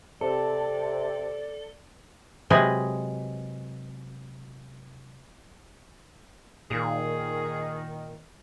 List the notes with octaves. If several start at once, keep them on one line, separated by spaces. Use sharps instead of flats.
C3 A4 D5
C3 F#3 G#3 B4 D#5 G#5
A#2 D#3 G#4